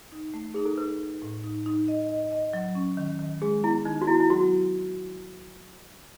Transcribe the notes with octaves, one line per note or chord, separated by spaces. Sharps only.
D#4
A3
D#4 G#4
A4
D#4 B4
D#4
A2
D#4
D#4
D#5
D#5
D#5
F#3
C#4
D#3
D#3
G#3 G#4
B3 E4
D#3 D#4
F#4
B3 E4
E4
F#3 F#4